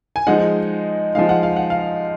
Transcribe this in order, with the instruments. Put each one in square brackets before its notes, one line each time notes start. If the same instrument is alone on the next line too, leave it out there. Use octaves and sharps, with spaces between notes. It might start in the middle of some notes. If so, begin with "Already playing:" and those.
[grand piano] G#5
F3 G#3 D#4 F#5
F3 G#3 D#4 F5
F#5
F5
F#5
F5